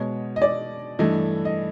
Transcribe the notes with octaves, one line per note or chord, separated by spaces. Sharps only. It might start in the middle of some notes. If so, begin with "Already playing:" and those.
Already playing: B2 G#3 B3 C#5
D#5
D5
G2 E3 A3 D#5
D#5